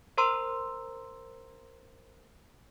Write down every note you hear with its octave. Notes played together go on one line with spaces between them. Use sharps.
A#4 C5 A#5 C6 E6